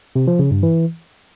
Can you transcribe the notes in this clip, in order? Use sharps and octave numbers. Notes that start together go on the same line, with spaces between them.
C3
F3
C#3
G2
E3